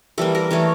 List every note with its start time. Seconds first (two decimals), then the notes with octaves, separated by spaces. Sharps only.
0.18 E3 G3 A#3 A4
0.35 A#4
0.51 E3 A3 C#5